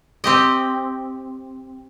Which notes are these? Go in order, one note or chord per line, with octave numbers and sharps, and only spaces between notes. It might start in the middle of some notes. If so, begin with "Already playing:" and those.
C4 G4 D#5